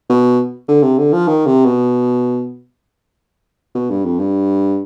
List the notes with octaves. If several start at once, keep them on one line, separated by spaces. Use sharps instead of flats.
B2
D3
C3
D3
F3
D#3
C3
B2
B2
G2
F2
G2